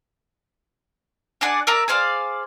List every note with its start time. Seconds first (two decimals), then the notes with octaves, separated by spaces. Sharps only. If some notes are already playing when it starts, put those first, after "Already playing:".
1.41 D4 G#4 D5 F#5
1.67 A#4 D5 E5 A#5
1.88 G#4 C5 D5 F5